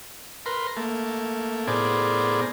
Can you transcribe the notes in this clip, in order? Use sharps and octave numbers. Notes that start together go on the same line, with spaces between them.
A#4 B4 C6
A3 A#3
A2 B3 G#4 A#4 C5 D5